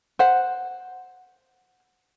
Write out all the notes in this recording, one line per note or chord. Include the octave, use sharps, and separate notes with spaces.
C5 F#5